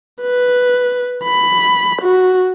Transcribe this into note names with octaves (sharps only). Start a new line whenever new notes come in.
B4
B5
F#4